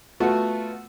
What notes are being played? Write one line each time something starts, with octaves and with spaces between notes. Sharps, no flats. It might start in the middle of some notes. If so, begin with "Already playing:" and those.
A3 B3 F4 F#4